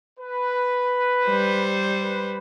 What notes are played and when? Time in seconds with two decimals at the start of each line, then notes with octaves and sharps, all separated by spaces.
0.19 B4
1.25 G3 C5
2.02 B4